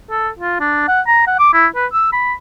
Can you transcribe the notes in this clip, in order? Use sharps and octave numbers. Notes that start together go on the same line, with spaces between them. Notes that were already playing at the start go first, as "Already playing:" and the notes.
A4
F4
D4
F#5
A#5
F#5
D6
E4
B4
E6
B5